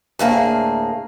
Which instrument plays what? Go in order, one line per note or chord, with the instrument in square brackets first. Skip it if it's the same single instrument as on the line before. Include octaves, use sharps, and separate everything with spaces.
[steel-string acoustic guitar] D2 A2 A#3 G#4